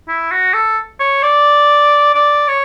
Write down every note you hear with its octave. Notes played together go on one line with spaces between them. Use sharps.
E4
F#4
A4
C#5
D5
D5
C#5